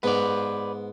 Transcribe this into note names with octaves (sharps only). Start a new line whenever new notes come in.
G#2 B3 B4 D5